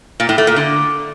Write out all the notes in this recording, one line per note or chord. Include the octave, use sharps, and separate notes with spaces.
A#2
A2
A3
A#2
D3